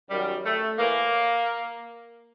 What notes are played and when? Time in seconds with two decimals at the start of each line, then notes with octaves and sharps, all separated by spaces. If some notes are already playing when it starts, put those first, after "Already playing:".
0.10 F#2 D#3 F#3 G3
0.45 A3
0.79 A2 E3 A#3